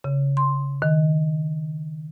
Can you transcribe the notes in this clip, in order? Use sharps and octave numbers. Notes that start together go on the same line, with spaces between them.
C#3
C6
D#3